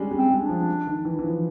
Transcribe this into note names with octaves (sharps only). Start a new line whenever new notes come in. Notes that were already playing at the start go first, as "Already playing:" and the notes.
Already playing: G3 G#3 C#4 D4
G3
C4
G#3
D4
F3
D#3
E3
E3
F3